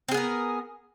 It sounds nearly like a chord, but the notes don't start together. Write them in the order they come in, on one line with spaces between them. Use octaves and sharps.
C4 G#4 B3 A#4